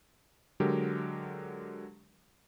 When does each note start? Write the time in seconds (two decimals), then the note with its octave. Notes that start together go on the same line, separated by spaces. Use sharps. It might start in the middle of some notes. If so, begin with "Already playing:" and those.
0.60 D3 F#3 G#3 G4 A#4